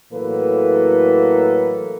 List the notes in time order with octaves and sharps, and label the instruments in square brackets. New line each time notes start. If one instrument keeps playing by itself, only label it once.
[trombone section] A2 E3 F#3 A#3 A4 B4